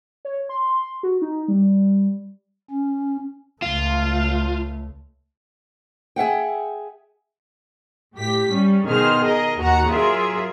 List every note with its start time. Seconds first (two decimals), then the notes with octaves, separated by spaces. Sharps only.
0.25 C#5
0.49 C6
1.03 F#4
1.22 D#4
1.48 G3
2.70 C#4
3.62 C#2 A3 F4
6.16 G#4 E5 F#5 G5
8.16 A2 G4 B6
8.52 G3 C#4
8.88 B2 D#3 G#4 C5 F6
9.22 G#4 A#4 D#5
9.60 D#2 F#4 F#5 A#5
9.90 F#3 F4 G#4 A#4 E5